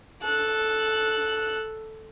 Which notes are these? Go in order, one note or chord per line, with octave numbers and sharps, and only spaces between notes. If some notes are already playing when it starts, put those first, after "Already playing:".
A4 F#6